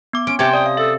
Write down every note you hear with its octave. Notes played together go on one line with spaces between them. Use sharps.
B3 D6
C#4 D7
C3 C#4 G4 G5 A5 D6 G#6
D5 D#6
F5
A4 E5